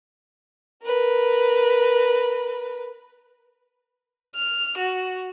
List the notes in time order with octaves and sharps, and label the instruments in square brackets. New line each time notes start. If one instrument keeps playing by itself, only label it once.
[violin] A#4 B4
[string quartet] F6
F#4